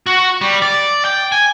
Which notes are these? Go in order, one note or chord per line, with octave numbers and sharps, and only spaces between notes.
F#4
G3
D5
G5
G#5